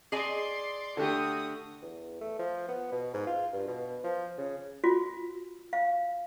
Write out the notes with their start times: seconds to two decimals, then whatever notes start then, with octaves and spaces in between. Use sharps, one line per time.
0.12 G#4 D5 D#5 G#5 C6
0.97 D3 A3 F#4 G4 D#6
1.82 E2
2.21 A3
2.39 F3
2.68 B3
2.92 B2
3.14 G#2
3.27 F4
3.53 G2
3.68 B2
4.04 F3
4.38 C#3
4.84 F4 F#4
5.73 F5